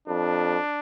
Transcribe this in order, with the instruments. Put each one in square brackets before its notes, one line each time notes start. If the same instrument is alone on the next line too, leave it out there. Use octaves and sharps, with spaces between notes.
[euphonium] F2 [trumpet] D4